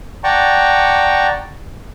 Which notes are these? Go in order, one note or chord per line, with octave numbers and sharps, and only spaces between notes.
D5 F#5 G5 A5 A#5 C#6